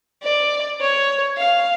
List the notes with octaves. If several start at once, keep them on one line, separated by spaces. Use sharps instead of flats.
D5
C#5
F5